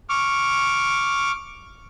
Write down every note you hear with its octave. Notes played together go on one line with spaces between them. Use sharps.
C#6 D6 F6